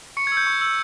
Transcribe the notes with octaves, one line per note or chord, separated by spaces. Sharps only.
C#6 C#7
G#6
E6
G6
C#6
E6 G6